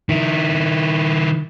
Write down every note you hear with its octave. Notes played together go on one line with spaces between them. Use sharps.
D#3 E4